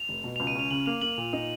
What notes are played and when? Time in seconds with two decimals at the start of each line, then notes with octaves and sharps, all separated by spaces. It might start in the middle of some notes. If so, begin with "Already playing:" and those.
Already playing: F7
0.09 F1
0.24 B2
0.36 C#2 F7
0.47 D#7
0.55 C#4 F7
0.71 C#3 F#7
0.86 A#3 F7
1.02 A#3 F#7
1.18 A#2
1.33 D#4